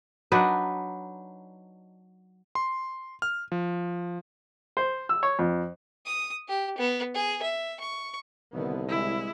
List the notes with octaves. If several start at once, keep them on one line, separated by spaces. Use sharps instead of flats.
F#3 D4 D#4 B4
C6
F6
F3
C5
E6
C#5
F2
D#6
G4
B3
G#4
E5
C#6
C2 D3 D#3 B3
G#3 E4